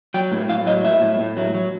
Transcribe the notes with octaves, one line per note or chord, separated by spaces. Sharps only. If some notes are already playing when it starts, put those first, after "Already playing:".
F#3 G5
A2
A2 F5
F#3 D#5
A2 E5
A2
A2
F#3
F#3